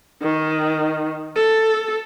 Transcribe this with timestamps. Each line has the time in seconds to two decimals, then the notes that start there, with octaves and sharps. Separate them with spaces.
0.22 D#3
1.36 A4